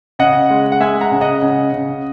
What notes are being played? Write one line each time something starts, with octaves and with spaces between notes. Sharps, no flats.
C#3 D#5 F#5
G#3
F#5
G#3 E5 G#5
F#5 A#5
C#3
D#5 F#5
C#3
C#3